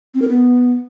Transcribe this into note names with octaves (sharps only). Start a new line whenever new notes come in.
C4
A#4
B3